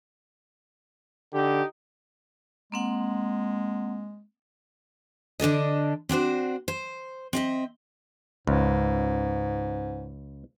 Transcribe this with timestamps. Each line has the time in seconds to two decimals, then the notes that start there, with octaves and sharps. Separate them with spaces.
1.34 D3 D#4 G4
2.72 G#3 A#3 C4 F#5
5.40 D3 D4 A4 D#5
6.09 C4 D4 F#4 C5
6.68 C5
7.33 C4 D#5 E5
8.47 C#2 G#2